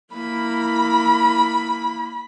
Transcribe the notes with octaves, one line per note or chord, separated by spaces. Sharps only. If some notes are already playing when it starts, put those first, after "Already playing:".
A#3 E4 B5